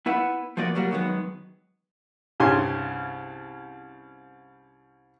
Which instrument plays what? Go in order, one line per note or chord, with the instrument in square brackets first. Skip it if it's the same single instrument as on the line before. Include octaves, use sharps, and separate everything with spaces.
[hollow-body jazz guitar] B3 E4 B4 F#5
F3 A#3 B3 F#4 D5
F#3 G3 A#3 F#4
F#2 D#3 F#3 G#3 B3
[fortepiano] C2 G2 C#3 G#5 C6